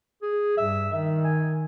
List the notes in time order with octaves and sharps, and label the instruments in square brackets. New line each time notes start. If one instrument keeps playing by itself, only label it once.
[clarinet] G#4
[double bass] G2 [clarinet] E5
[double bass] D#3 [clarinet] E5
[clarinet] G#5